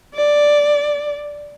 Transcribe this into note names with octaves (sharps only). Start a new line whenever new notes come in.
D5